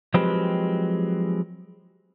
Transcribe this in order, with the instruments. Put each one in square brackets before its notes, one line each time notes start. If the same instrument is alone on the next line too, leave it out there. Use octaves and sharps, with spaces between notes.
[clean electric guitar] F3 F#3 G#3 C4 G4 B4